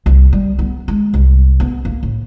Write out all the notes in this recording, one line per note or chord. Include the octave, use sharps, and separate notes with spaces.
C2
G3
B3
G#3
C2
B3
A#3
A2